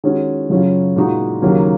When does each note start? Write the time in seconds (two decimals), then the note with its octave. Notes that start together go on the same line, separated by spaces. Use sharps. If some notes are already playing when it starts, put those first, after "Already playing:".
0.04 D#3 G#3 C#4 F#4
0.50 F#2 C#3 F#3 C#4 F4
0.96 A#2 G#3 D#4 F#4
1.42 D#2 C#3 F#3 A#3